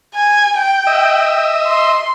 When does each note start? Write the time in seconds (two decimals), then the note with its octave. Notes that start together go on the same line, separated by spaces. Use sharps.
0.15 G#5
0.58 G5
0.87 D#5 E5
1.66 C6